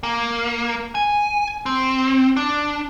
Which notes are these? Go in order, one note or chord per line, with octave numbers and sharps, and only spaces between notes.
A#3
G#5
C4
D4